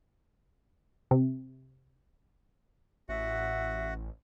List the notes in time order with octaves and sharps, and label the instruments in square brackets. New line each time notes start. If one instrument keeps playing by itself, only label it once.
[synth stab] C3
[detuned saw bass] A1 [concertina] F#4 F#5 [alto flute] E5